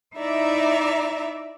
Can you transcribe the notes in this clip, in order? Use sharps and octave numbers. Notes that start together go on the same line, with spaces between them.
D#4 E4 D5 E5 A#5